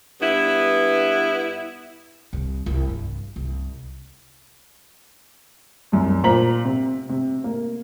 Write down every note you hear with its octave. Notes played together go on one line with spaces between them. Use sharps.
G2 B3 E4
C2
C2
G2
C2
C2 F#2
A#2 C5 A#5 B6 F#7
C3
C3
A#3